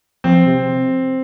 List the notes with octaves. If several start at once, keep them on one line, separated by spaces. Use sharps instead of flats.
F3 C4
C3